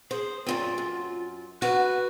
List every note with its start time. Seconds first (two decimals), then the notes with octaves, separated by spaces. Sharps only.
0.11 G#4 C5
0.46 F#2 A#2 C4 F4
0.78 F#2
1.62 F#4 B4